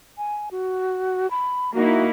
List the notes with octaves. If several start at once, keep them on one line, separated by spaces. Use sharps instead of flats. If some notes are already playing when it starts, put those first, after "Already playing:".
G#5
F#4
B5
A#3 D#4 E4 F#4